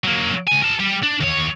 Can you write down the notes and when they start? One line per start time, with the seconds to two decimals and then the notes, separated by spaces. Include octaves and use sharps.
0.04 F#3 A#3
0.48 C#2 G#5
0.63 A#4 A5
0.80 G3 G4
1.03 D4
1.20 D#2 C#5